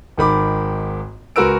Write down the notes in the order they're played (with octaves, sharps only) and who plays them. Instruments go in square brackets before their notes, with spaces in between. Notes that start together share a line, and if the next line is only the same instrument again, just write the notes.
[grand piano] G#1 D#3 B5 D6
C#2 F#4 A#4 B4 E6 D7